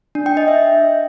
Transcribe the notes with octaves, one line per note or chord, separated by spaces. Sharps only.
D4
G5
D#5
E5